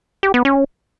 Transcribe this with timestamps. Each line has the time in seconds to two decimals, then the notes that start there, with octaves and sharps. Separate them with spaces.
0.23 G4
0.34 B3
0.45 C#4